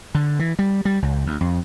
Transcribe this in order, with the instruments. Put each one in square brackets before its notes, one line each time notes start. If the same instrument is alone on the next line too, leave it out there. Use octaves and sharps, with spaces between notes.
[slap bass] D3
E3
G3
G3
C#2
D2
F2